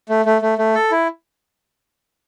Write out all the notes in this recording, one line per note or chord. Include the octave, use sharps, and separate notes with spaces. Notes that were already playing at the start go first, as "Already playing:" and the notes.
A3
A3
A3
A3
A4
E4